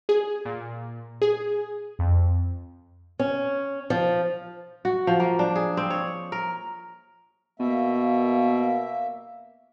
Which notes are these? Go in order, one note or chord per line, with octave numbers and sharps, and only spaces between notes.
G#4
A#2
G#4
F2
C#4
F3
F#4
F3
A#3
D4
G#4
C4
C#5
A#4
B2 A#3 E5